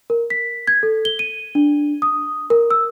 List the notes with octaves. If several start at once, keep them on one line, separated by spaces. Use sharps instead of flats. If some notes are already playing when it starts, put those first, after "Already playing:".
A#4
B6
G#6
A4
G7
D#7
D4
D#6
A#4
E6